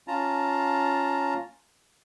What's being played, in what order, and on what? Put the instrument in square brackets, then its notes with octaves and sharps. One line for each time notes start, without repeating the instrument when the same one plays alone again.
[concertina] C#4 F4 A5 A#5